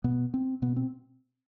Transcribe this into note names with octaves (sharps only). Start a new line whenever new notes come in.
B2 B3
C4
B2 B3
C4